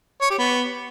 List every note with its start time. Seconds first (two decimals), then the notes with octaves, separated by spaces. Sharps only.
0.22 C#5
0.30 G4
0.39 B3